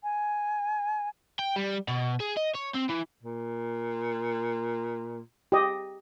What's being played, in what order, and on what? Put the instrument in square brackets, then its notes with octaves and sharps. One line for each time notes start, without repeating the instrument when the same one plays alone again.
[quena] G#5
[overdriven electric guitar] G5
G3
B2
G#4
D#5
C#5
C4
E3
[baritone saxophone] A#2
[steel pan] G4 D#5